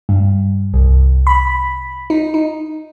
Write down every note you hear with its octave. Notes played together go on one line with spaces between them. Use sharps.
G2
C2
B5
D#4
D#4